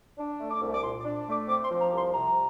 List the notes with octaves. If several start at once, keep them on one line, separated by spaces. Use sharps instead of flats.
D4
A3
D6
C2
D6
A#2 C6
D6
D4
A3
D6
C4 D6
C6
F3
A#5
C2
C6
C3 A#5